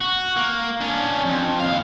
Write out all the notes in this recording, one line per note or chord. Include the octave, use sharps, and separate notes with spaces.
F#4
A#3
C#4 D4
F2
D#2 F5